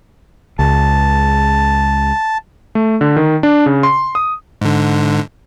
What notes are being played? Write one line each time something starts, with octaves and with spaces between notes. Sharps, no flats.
C#2 A5
A3
D3
D#3
D4
C#3
C6
D#6
G#2 D3